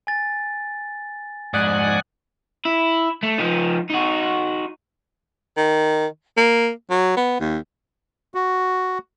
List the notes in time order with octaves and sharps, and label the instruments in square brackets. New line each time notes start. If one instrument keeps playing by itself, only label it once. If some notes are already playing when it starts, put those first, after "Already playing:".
[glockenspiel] G#5 A6
[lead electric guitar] F2 G#2 [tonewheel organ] D5 F#5 G#5 [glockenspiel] D#6 F#6 F#7
[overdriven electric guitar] E4
A3
F3 D#4
D#4 F#4
[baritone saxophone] D#3
A#3
F#3
B3
D#2
[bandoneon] F#4